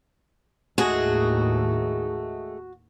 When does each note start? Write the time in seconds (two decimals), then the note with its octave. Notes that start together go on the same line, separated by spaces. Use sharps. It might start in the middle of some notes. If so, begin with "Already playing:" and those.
0.78 D#2 A2 D#3 G#3 A3 F#4 G#4